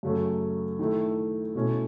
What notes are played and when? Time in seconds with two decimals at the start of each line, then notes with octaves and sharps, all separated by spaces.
0.03 F#2 C#3 F#3 A3 C#4
0.79 D#3 A3 E4
1.55 B2 A3 C#4 E4